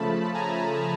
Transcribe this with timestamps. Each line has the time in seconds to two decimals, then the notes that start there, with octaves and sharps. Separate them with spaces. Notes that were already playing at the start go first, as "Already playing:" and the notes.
Already playing: C#3 F3 A3 A5 B5
0.34 G#5 A#5